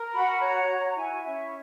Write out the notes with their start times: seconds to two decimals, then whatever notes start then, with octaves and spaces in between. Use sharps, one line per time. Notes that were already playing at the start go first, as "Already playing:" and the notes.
Already playing: A#4
0.13 F#4 B5
0.41 C#5 A#5
0.68 F#4
0.89 A#5
0.96 E4 G#5
1.24 C#4 E5